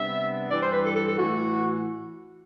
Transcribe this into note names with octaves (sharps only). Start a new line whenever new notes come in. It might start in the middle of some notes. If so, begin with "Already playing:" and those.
Already playing: C3 G3 B3 D4 E5
G2 E3 G3 D5
C5
B4
A4
A4
A4
A2 E3 A3 F#4